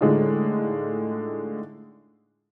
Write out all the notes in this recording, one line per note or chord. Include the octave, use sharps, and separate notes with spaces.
A2 D3 G#3 D#4 F4